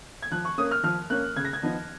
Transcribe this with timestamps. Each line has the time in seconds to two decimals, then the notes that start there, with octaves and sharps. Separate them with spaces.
0.22 G#6
0.31 F3 F#6
0.45 C#6
0.58 A#3 C#4 D#6
0.71 F6
0.83 F3 F6
1.10 A#3 C#4 F#6
1.36 C#3 G#6
1.45 A#6
1.53 G#6
1.63 F3 B3 D#4